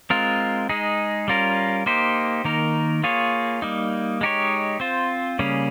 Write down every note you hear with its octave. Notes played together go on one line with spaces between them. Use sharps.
G#3 C4 F4 A#4
G#3 D#4 G#4
G3 C#4 F4 A#4
A#3 D#4 G4 C5
D#3 A#3 D#4 A#4
A#3 F4 G#4 C#5
G3 A#3 D#4
G#3 D#4 G4 C#5
C4 F4 C5
C#3 G3 A#3 C#4 G#4